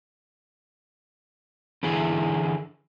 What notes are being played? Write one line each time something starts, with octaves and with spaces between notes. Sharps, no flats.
D3 E3 E4 G#4